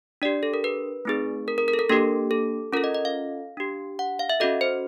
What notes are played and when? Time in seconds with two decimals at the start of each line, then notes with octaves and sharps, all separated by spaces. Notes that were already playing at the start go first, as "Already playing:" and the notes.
0.22 D4 G4 D5
0.43 A4
0.54 A#4
0.64 B4
1.05 A3 C4 D#4 G#4
1.48 A#4
1.58 A#4
1.68 A#4
1.73 A4
1.79 A#4
1.89 A#3 D4 G4 A4
2.31 A4
2.73 C#4 F4 A4 A#4
2.84 D#5
2.94 D#5
3.05 F5
3.57 D4 G4
3.99 F#5
4.19 F5
4.29 E5
4.40 C#4 F#4 A4 D#5
4.61 C5